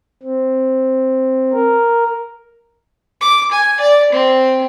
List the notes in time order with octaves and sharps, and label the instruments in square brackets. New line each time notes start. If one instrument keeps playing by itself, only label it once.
[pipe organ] C4
A#4
[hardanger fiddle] D6
G#5
D5
C4